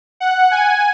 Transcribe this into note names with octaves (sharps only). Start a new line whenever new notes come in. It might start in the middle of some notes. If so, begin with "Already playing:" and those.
F#5
G#5